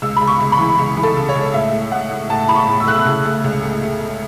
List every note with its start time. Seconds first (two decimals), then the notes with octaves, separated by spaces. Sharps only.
0.02 C#2 E6
0.16 C#2 B5
0.27 C#6
0.40 C#2
0.52 B5
0.59 E3
0.78 C#2
0.97 E3
1.03 A4
1.16 C#3
1.29 C#5
1.35 C#2
1.54 A2 E5
1.73 A3
1.92 A2 F#5
2.11 A2
2.30 A2 A5
2.49 A2 B5
2.55 C#6
2.68 A2
2.80 E6
2.87 A3 F#6
2.95 E6
3.05 C#3
3.25 A3
3.44 C#2
3.63 A3
3.82 A3
4.01 A3